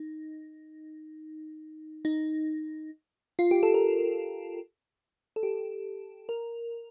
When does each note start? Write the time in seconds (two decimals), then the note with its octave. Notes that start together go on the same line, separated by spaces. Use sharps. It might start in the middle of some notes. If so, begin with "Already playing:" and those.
Already playing: D#4
2.05 D#4
3.39 F4
3.51 G4
3.63 A4
3.74 A#4
5.36 A4
5.43 G4
6.29 A#4